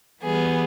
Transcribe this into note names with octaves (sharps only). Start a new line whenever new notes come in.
E3 G3 B3 G#4